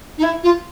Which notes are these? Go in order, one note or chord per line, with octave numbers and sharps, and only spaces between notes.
D#4
E4
F4